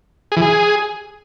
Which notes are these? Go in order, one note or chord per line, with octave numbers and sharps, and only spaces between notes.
G#4
E3
G#4